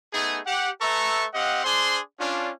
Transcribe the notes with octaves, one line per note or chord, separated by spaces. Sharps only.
A3 B3 D#4 G#4
G4 F#5
A3 A4 B4 E5 A#5 C#6
C4 G4 D#5 F5 F#5
D4 G#4 C5 C6
C#4 D4 F4